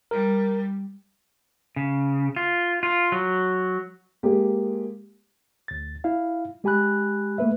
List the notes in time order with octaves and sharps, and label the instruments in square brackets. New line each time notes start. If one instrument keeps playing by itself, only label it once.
[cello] G3 [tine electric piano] A#4
[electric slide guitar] C#3
F4
F4
F#3
[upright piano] G#3 A#3 G4
[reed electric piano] D2 A6
E4 F5
G#3 G4 G#5 B5 F#6
A3 A#3 B4 E5